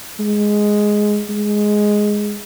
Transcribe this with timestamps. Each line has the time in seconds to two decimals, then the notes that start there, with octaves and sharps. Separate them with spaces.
0.20 G#3
1.29 G#3